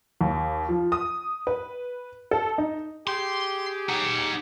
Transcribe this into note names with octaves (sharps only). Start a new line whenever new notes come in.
D#2
F3
D#6
B4
A4
D#4
G4 G#4 C6
D#4 F#5